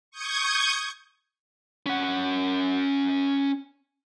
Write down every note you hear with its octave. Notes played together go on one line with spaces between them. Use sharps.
C#6 D#6 G6 G#6
C#4 F#5